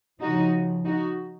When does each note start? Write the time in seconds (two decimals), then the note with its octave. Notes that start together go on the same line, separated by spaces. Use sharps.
0.21 C#3 F3 D#4 F#4
0.85 D#4 F#4